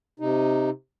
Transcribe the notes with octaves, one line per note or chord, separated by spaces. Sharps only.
C3 D#4